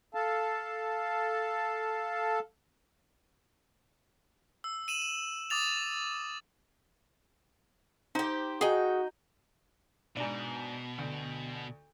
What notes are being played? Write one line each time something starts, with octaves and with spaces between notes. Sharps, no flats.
A4 F5 A5
E6
D#7 E7 F#7
E7
D6 D#6 A6 F7
D#4 G4 C5
D#4 F#4 G#4 G5
G#2 B2 D4
D2